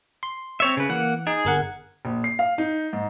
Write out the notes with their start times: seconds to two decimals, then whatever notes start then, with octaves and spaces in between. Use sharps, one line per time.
0.23 C6
0.60 C4 C#5 E5
0.77 C#3 B4
0.89 E3 A#3 F#5
1.27 D#4 G#4
1.45 G1 A#4 F#5
2.05 A#1
2.24 C7
2.39 F5
2.58 D#4
2.93 G#2